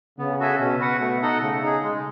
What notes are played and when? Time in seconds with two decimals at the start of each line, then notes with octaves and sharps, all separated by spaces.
0.18 C#3 B3
0.40 F#4 A4 E5 G#5
0.59 B2 C#4
0.80 F#4 B4 F#5
1.00 A3
1.22 D#4 A4 D#5 F#5
1.42 C#3 A3
1.63 D#4 G#4
1.83 G#3